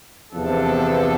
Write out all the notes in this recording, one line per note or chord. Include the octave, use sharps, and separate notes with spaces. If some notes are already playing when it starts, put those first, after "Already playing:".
E2 C3 F3 B3 D4 A4